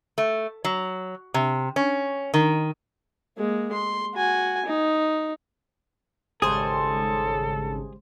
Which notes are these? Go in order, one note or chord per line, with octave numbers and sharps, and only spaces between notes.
A3
F#3
C3
C#4
D#3
G#3 A#3
C6
F#4 G#5
D#4
G#1 C#3 G3 G#3 G#4 A4 C5